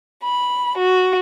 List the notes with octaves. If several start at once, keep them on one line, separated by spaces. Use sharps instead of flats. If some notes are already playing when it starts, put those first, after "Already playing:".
B5
F#4